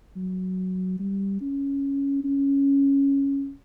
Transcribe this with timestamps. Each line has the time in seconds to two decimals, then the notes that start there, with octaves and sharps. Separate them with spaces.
0.16 F#3
1.00 G3
1.41 C#4
2.24 C#4